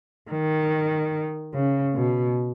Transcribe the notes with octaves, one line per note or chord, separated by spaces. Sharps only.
D#3
C#3
B2